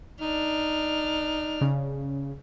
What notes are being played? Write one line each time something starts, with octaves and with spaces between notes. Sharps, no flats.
D4 D#4 F6
C#3